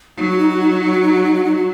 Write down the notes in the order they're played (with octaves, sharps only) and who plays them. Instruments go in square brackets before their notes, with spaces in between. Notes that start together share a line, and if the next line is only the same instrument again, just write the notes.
[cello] F#3 [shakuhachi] D#4
[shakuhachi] F#4
D#4
F#4
D#4
F#4
D#4
F#4
D#4
F#4
D#4
F#4
D#4
F#4